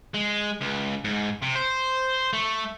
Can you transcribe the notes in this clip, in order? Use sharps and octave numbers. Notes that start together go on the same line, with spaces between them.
G#3
C#2
G#2
C3
C5
A3